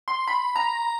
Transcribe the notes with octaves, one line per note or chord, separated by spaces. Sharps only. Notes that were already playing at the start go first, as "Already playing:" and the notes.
C6
B5
A#5